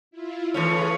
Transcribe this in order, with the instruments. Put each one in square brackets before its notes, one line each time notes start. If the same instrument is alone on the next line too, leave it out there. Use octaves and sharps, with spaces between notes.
[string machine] E4 F4
[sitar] E3 A3 C#4 [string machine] F4 G#4 B4